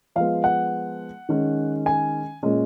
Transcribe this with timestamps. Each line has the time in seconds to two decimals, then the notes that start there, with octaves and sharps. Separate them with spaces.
0.16 F3 G#3 B3 F5
0.44 F#5
1.29 D#3 G#3 C#4
1.86 G#5
2.43 A#2 G#3 C#4